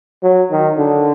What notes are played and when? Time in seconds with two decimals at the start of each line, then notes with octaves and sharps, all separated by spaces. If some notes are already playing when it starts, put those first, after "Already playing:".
0.23 F#3
0.51 D#3
0.78 D3